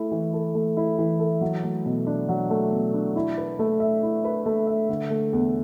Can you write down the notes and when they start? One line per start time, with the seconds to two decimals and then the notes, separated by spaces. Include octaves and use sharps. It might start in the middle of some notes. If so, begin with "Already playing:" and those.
Already playing: A3 E4
0.11 E3
0.33 A4
0.55 A3
0.77 E4
0.99 E3
1.19 A4
1.41 F#3
1.64 A3
1.86 B2
2.07 D4
2.29 F#3
2.50 A3
2.72 B2
2.94 D4
3.16 E4
3.38 B4
3.59 A3
3.80 E5
4.03 E4
4.24 B4
4.46 A3
4.67 E5
4.89 D3
5.10 A3
5.33 E2